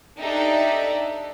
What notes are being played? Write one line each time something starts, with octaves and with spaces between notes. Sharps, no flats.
D4 D#4 G4 A4 E5